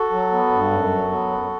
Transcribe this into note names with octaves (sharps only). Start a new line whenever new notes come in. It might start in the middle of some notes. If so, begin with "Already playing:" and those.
Already playing: F#4 A4
F#3
B3
G2
F#2
F#3
B3
F#2